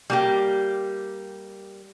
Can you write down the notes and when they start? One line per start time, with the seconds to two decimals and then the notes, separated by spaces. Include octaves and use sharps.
0.10 G3 A#3 G4